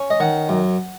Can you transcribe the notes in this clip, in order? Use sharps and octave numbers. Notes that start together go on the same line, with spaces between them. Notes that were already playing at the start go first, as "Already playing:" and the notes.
Already playing: C#4
D#5
D#3 F#5
F#2